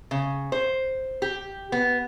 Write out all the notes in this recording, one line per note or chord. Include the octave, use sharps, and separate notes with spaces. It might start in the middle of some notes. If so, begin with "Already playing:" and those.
C#3
C5
G4
B3